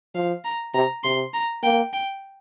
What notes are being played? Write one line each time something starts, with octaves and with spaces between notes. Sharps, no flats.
F3 F5
A#5
C3 A#5
C3 C6
A#5
A#3 G5
G5